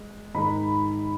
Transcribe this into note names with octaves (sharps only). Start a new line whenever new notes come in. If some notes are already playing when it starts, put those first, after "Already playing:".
Already playing: G#3
G#2 D#3 G#3 D#4 B5